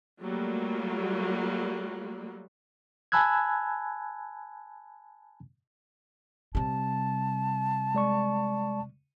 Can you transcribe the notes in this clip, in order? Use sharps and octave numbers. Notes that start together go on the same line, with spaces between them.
F#3 G3 A3 A#3 F4
G#5 A5 B5 E6 F#6 G#6
C3 G3 A5
G#3 D5 C#6